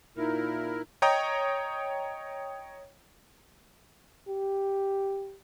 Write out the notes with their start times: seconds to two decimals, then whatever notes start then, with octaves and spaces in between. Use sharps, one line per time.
0.17 A#2 D#4 E4 A#4
1.02 C#5 D#5 G5 A#5 D#6
4.28 G4